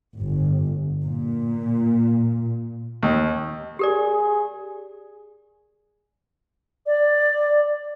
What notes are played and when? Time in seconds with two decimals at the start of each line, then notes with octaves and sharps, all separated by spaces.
0.19 G1
1.02 A#2
3.03 D#2
3.79 G4 G#4 A#4 D5
6.86 D5